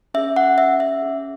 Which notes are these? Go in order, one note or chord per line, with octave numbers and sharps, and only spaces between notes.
C#4 G#4 E5
F#5
E5
E5
C#4 G#4